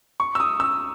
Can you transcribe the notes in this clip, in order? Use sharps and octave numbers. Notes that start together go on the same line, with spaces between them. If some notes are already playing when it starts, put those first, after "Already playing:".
C#6
E6
D#6
E6